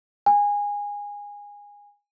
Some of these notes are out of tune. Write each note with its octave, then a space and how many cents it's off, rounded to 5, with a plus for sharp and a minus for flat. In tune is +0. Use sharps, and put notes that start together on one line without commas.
G#5 -20